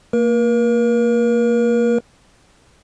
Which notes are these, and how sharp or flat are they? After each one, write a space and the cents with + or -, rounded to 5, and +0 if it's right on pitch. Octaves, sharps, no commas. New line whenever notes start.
A#3 -20 A#4 +40